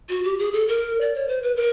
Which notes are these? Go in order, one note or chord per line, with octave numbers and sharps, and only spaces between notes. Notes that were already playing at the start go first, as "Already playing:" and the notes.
F#4
G4
G#4
A4
A#4
D5
C#5
C5
B4
A#4